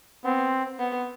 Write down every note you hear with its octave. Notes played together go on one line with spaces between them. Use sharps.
B3 C4
B3